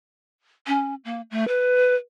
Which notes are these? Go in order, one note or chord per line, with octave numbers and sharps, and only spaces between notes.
C#4
A#3
A3
B4